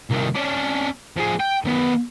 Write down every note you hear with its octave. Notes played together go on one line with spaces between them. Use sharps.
C2 D#3
C#4 D4
F3 G#4
G5
D#3 B3